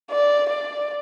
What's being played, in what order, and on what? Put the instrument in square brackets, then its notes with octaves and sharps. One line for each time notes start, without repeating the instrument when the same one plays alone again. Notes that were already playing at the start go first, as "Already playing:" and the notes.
[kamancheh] D5
D5